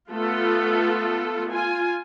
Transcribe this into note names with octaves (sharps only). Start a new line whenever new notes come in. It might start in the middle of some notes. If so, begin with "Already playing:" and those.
A3 B3 F4 A4
F4 G#5